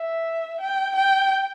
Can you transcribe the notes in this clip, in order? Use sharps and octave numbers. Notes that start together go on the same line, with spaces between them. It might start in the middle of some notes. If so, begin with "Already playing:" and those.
Already playing: E5
G5
G5